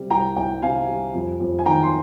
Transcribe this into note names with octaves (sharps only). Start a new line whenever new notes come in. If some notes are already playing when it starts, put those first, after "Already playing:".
Already playing: C3 G3
C2 G5 A#5
C2 G5
C3 F5 G#5
G3
F2
F2
G#5
D#3 G5 A#5
C6